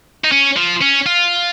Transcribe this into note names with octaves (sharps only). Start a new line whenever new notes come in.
D#4
C#4
F3
C#4
F4